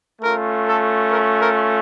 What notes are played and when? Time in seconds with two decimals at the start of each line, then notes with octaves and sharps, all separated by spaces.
0.21 A3 C#4 F4 A#4
0.65 A4
1.10 A#4
1.40 A#4